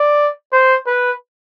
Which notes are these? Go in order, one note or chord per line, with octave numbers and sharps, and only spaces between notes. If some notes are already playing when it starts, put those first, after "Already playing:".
Already playing: D5
C5
B4